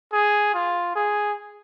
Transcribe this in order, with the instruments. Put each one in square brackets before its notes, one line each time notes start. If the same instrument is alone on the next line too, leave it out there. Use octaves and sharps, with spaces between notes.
[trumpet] G#4
F4
G#4